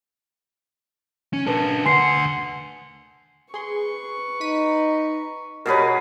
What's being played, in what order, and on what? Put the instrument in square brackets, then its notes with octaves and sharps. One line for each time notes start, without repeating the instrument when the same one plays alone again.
[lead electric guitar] C#4
[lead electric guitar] D4 A#4 [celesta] B4 A5
[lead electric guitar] D2 F#5 [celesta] G#5 C6 C7
[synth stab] G#4 C6 [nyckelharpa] B4 C#6
[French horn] D#4 [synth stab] B6 D#7
[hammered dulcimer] B2 G#4 B4 [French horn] G4 [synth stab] A#4 C#5